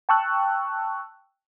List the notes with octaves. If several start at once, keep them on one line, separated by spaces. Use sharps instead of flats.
G5 A5 C#6 E6 F#6